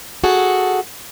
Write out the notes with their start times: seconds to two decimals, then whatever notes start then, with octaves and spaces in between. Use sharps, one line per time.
0.24 F#4 G#4 A4